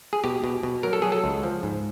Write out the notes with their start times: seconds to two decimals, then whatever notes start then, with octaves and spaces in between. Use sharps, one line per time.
0.13 G#4
0.24 B2 G4
0.44 B2
0.63 B2
0.83 F#3 A#4
0.93 A4
1.02 F#3 G#4
1.12 A4
1.24 C#2
1.43 F3
1.63 G#2